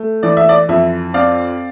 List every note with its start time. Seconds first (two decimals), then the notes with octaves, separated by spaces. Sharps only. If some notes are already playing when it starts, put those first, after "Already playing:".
Already playing: A3
0.23 E3 D5
0.37 E5
0.49 D5
0.69 F2 E5
1.14 C4 D5 F5